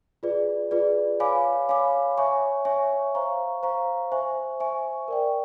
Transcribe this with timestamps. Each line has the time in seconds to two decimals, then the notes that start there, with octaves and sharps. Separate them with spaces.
0.23 F4 G#4 B4 D5
0.71 F4 G#4 B4 D5
1.20 C#5 F5 G#5 B5 D6
1.69 C#5 F5 G#5 B5 D6
2.18 C#5 E5 G#5 C#6
2.65 C#5 E5 G#5 C#6
3.15 C5 F5 A#5 C#6
3.63 C5 F5 A#5 C#6
4.12 C5 E5 G#5 C#6
4.60 C5 E5 G#5 C#6
5.08 A#4 D5 G5